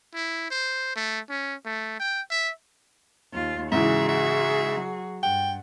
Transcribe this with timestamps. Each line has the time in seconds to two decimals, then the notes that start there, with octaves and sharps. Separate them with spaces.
0.14 E4
0.50 C5
0.96 A3
1.30 C#4
1.65 A3
2.00 G5
2.31 E5
3.34 D#2 F4
3.72 G#2 C#3 E3 F#4 G#4 E5
4.09 E5
4.77 F#3
5.23 G2 F#5 G5